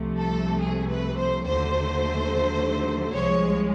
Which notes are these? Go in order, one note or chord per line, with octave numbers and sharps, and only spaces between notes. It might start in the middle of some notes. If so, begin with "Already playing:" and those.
Already playing: C2 C3 F3 A3
A4
G#4
B4
C5
D#2 D3 F#3 A3 C5
C2 A#2 F3 G#3 C#5